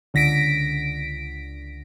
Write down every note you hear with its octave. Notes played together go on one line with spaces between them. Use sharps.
C#2 D3 A#6 B6 D7